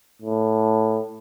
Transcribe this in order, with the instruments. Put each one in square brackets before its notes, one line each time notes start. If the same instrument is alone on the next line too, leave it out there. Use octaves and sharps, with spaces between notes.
[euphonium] A2